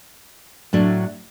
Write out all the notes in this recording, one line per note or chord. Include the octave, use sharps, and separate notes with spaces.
A2 F#3 A3 D4